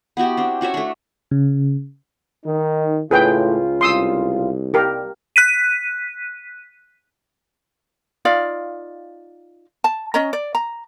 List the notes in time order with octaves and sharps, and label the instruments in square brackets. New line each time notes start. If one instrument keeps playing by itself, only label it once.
[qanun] B3 E4 F#4 G4
C4 D4
C#4 F#4 C#5 E5
A3 D4
[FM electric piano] C#3
[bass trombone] D#3 [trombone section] D#4
[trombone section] C#2 C#3 F4 [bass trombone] A2 [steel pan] G#4 B4 G5
[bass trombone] C2 [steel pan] C6 D#6 E6
[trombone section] G3 [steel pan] G4 A#4
[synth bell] F#6 B6 D#7
[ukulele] D#4 F4 D5 F5
A5
C#4 C#5 D#5 A#5
D5
A#5